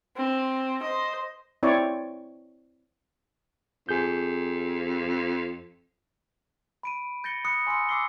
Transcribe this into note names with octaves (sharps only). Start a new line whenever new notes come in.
C4
C5 D#5
C4 E4 C#5 D5
F2 G#4 G6
B5 D7 D#7
G6 A6 A#6 C#7 G7
B5 D#6 F#6 C#7
G#5 C6 D#6 E6 C#7
D6 E6 C7 G7